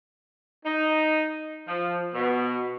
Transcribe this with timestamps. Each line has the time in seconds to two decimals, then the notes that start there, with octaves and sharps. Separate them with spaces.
0.66 D#4
1.68 F3
2.15 B2